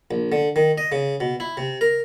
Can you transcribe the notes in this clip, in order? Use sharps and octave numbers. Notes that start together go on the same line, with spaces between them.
A#1
D3
D#3
D#5
C#3
B2
E4
C3
A#4